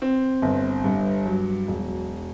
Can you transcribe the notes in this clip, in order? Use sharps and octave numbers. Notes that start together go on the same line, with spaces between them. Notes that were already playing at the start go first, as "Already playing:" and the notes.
C4
G1
G2
F#3
E1